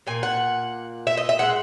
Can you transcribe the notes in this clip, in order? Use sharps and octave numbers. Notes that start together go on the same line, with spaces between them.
A#2 A#3 G#5
F#5
E5
D#5
E5
A#2 G#3 F#5